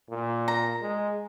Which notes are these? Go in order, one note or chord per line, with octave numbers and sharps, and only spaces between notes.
A#2
A#5
G#3